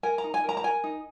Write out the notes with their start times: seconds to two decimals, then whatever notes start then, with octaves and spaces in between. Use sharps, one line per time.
0.03 A#4 G#5
0.18 A#5
0.24 D#4
0.34 G#5
0.44 A#4 A#5
0.57 A#5
0.64 A#4 G#5
0.84 D#4